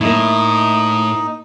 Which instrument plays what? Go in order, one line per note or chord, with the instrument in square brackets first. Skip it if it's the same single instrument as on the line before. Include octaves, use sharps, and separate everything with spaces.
[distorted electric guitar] A2 [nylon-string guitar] A#3 E4 [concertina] D#4